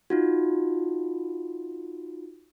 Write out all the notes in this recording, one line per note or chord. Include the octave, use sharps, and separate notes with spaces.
D#4 F4 F#4